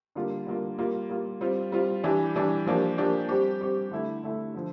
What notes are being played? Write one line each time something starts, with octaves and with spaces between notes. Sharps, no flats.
D3 G3 A#3 F4
D3 G3 A#3 F4
G3 A#3 F4
G3 A#3 F4
G3 C4 F4
G3 C4 F4
E3 G3 D4 G4
E3 G3 D4 G4
F3 A#3 D4 G4
F3 A#3 D4 G4
G3 C4 G4
G3 C4 G4
D3 A3 E4
D3 A3 E4
D3 F3